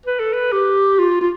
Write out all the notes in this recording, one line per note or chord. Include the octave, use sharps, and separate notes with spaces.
B4
A4
B4
G4
F4
F4